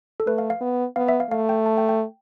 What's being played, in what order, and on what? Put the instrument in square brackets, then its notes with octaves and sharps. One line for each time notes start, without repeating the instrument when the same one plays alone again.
[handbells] A4
[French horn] A3 [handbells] B4
[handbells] F5
F5
[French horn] B3
[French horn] B3 [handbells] F5
[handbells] E5
F5
[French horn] A3 [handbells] F5
[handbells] G5
A5
G5
G5